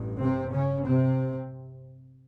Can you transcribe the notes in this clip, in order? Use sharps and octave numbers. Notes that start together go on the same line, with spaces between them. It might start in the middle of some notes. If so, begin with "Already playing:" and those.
Already playing: A1 G2
C3 C4
C#3 C#4
C3 C4